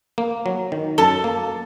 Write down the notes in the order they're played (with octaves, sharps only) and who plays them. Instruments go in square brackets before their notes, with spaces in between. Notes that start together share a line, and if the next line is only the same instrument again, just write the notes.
[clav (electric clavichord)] A#3
F#3
D#3
[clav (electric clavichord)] F#2 [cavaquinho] A4 A5
[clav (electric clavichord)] A#3